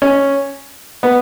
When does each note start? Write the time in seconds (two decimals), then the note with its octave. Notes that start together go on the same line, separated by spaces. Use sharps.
0.02 C#4
1.03 B3